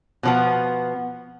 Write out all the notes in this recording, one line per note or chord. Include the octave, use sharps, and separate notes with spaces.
B2 F3 B3